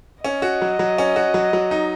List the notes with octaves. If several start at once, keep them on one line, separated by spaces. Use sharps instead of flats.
C#4 D#5
F#4
F#3
F#3
C#4
F#4
F#3
F#3
D#4